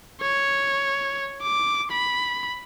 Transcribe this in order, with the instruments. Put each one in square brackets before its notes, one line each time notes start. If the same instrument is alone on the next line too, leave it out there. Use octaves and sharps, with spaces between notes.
[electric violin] C#5
D6
B5